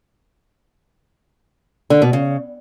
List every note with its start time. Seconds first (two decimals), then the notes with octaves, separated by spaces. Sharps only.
1.90 D3
2.02 B2
2.13 C#3